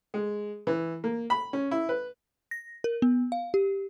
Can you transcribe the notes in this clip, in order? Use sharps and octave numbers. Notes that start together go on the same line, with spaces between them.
G#3
E3
A#3
B5
C#4
E4
B4
A#6
A#4
B3
F5
G4